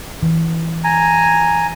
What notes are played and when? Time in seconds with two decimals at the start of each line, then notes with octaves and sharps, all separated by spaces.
0.23 E3
0.84 G#5 A#5